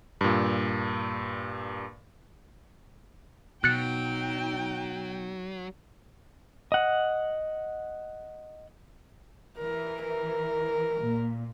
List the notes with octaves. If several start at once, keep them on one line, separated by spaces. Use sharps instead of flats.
G2 A#2
B2 F#3 D#4 G5 F#6 A6 C#7
D#5 F#5
E3 A#4
A#4
A#2